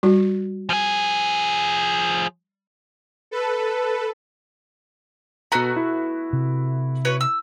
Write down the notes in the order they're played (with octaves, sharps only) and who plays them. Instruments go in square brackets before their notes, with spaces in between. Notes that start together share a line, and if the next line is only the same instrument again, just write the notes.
[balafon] G3 F#4
[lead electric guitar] F3 G#4
[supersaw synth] A4 B4
[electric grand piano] B2 A#5 [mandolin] A3 B3 F#4
[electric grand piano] E4
[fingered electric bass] C3
[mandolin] F#4 B4 C#5
E6